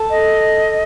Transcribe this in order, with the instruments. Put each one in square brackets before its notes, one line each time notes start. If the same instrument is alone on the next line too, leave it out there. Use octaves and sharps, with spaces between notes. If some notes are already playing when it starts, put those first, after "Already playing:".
Already playing: [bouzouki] A4
[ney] D#5